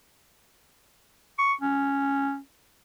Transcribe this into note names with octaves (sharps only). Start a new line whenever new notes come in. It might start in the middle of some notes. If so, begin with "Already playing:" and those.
C#6
C#4